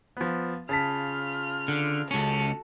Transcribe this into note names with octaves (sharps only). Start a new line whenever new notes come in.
F3 B3
C#3 F4 A5 F6 B6
D3
C#2 C#4 F#4 A4